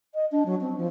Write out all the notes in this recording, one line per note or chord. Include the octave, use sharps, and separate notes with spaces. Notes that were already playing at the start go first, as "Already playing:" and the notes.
D#5
D4
F#3
C4
F3